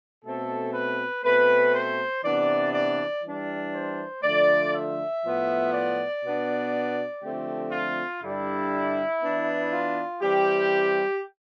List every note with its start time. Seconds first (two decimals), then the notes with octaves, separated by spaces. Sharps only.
0.23 B2 A3 C4 A4
0.73 B4
1.24 B2 A3 C4 B4
1.74 C5
2.23 C3 E3 B3 D4 D5
2.74 D5
3.23 E3 G3 D4
3.74 C5
4.22 D3 F3 A3 D5
4.74 E5
5.23 A2 F3 B3
5.73 D5
6.23 B2 B3 D4
7.22 D3 F3 A3 C4 G4
7.72 F4
8.23 G2 D3 G3 D4 E4
9.22 E3 B3 D4
9.72 F4
10.22 E3 G3 C4 G4